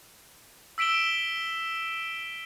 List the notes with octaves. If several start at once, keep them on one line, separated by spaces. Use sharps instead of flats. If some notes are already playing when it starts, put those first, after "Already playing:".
E6 B6 D7 E7 G7